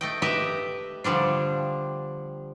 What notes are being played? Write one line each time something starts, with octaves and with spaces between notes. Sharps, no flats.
A3 D#5 G5
G4 B4 D#5 E5 G5
D3 F3 G3 D4